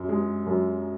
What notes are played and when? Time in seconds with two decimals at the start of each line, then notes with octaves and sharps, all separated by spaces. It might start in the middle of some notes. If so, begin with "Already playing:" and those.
Already playing: F#2
0.09 G#3
0.46 F#2